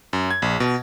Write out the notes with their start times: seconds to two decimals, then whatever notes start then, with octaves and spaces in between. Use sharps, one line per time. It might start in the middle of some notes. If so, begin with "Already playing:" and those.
0.13 F#2
0.31 G#6
0.42 A#1
0.60 B2